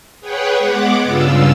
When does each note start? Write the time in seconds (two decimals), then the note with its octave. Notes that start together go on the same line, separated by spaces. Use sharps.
0.21 G#4 B4 C#5 F#5 G5
0.58 G#3 B3 F#5 D6
1.02 G2 C#3 F4 E6